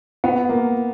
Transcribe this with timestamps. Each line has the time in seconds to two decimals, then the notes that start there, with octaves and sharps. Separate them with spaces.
0.24 B3
0.49 A#3